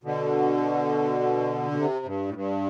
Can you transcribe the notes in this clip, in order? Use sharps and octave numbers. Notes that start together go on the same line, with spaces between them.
B2 D3
B2
C3
G2
A2
G2